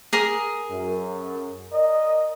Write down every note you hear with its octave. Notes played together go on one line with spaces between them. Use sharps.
G#4 A#4 D#6
F#2
A#4 D5 D#5